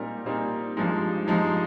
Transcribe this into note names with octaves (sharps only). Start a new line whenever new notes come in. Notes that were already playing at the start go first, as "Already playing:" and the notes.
Already playing: A#2 G3 C4 D#4 A#4
A#2 G3 C4 D#4 A#4
G2 F3 G#3 D#4
G2 F3 G#3 D#4